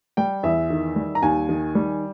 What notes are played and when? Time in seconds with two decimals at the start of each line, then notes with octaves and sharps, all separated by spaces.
0.17 G3 G5
0.43 E2 E5
0.70 D#3
0.96 G3
1.15 A#5
1.22 D#2 G#5
1.49 D#3
1.75 G3